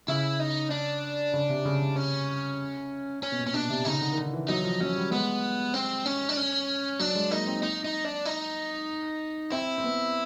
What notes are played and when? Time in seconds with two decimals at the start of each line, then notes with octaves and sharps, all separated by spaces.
0.08 C#3 E4
0.40 D#4
0.71 D4
1.34 C#3
1.49 C3
1.65 C#3
1.82 C3
1.96 C#4
3.23 C#4
3.32 B2
3.39 A#2
3.47 C#4
3.54 B2 D4
3.70 C3
3.85 C#3 D#4
4.01 D3
4.13 D#3
4.18 D3
4.33 E3
4.49 F#3 D#4
4.64 F3
4.80 F#3 C#4
4.96 G3
5.11 G#3 B3
5.74 C4
6.06 C#4
6.29 D4
6.37 C#4
7.00 F#3 D4
7.15 G#3
7.31 A#3 D#4
7.47 C4
7.63 D#4
7.84 D#4
8.05 D4
8.25 D#4
9.52 C4 E4
9.78 C4
9.83 B3